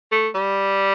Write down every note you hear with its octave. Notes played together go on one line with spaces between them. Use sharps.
A3
G3